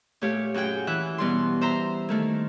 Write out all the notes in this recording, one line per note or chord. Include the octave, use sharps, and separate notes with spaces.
A#2 A3 G4 C#5 F5
F#2 F#4 G#4 G5 G6
E3 E5 F#6
B2 G3 C6
C5 E5 A#5 C6
D#3 A3 A#3